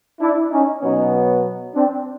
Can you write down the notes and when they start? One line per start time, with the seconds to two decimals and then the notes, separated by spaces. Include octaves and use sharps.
0.20 D4 E4
0.51 C#4 D#4
0.82 B2 F#3 B3 C#4 D#4
1.75 C4 D4